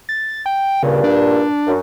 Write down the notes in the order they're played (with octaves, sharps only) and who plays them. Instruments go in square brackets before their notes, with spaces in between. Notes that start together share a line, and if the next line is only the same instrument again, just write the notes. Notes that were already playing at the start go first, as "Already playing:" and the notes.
[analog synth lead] A6
G5
[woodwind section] G2 A#2 [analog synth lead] C#3
[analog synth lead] D4
[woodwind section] F#2